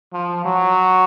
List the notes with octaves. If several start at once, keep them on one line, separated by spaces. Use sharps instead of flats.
F3
F#3